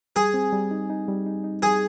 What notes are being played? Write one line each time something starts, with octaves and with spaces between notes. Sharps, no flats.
G3 G#4
C4
G3
D#4
D#4
G3
D#4
D#4
G3 G#4